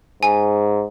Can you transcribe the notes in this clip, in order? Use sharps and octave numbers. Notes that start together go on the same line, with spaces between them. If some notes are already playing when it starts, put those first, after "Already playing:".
G#2 G#5